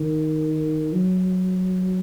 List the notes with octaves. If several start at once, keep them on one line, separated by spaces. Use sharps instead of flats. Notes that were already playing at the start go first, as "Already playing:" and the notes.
Already playing: D#3
F#3